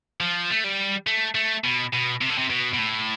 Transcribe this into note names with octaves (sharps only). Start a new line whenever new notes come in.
F3
A3
G3
A3
A3
B2
B2
C3
D3
C3
B2
B2
A2